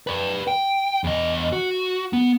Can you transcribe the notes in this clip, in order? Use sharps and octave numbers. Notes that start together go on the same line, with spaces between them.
B4 D5
G5
E2 D#5
F#4
B3